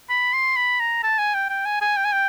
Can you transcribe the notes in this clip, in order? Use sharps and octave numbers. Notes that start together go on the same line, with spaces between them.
B5
C6
B5
A#5
A5
G#5
G5
G5
G#5
G#5
G5
G#5
G5